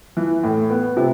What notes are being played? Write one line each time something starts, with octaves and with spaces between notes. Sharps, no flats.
E3
A2
B3
C3